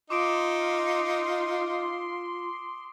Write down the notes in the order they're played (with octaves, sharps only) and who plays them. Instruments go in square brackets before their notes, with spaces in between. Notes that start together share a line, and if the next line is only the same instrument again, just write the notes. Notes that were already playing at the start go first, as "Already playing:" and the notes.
[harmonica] D#4 [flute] F4 [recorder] C6 [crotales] D6 D#6 D7